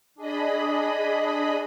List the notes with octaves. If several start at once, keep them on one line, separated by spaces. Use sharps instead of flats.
D4 G#4 D#5 B5